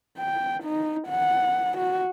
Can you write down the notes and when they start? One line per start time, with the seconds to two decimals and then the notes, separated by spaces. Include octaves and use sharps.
0.18 G5
0.63 D#4
1.09 F#5
1.77 F#4